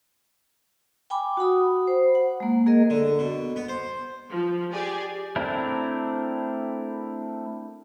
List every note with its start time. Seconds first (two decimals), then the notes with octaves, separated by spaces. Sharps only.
1.10 G5 G#5 B5 D6
1.37 F#4 F#5 B5 D#6
1.87 C5
2.15 F#5
2.40 G#3 A#3
2.66 A#3 G#4 A#4 D#5
2.90 D3
3.19 B2
3.56 B3
3.68 C5
4.29 F3
4.73 G4 G#4 D5 G#5
5.36 A3 C4 D4 E4 A#4